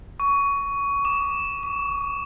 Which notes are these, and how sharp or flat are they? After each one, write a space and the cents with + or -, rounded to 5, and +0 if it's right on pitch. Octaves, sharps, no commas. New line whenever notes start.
C#6 +20
D6 +15
D6 -30